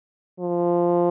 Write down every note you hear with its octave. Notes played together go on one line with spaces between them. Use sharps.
F3